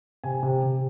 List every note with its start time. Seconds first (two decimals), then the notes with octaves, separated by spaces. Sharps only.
0.24 C3 G#5
0.43 C3
0.63 C3